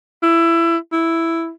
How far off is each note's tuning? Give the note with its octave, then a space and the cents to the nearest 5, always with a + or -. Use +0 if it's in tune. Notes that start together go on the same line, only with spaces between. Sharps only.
E4 +20
E4 +5